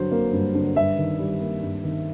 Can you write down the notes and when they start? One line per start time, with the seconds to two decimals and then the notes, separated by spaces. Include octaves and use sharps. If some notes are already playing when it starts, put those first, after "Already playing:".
Already playing: G2 D3 F#3 C5
0.11 A#3
0.33 G2
0.55 D3
0.76 G2 E5
0.98 D#3
1.19 G3
1.41 A#3
1.62 G2
1.84 D#3